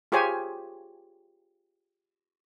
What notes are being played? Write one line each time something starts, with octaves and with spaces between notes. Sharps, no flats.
F4 G4 G#4 C5 C#5 G#5